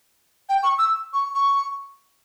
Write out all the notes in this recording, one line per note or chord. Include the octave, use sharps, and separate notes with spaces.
G5
C#6
E6
C#6
C#6